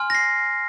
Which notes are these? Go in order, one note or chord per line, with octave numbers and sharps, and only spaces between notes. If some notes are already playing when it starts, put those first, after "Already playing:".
Already playing: G#5 C6 F6
A#6
C7